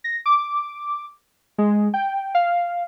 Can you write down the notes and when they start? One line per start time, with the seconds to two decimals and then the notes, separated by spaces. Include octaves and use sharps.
0.04 A#6
0.26 D6
1.58 G#3
1.94 G5
2.35 F5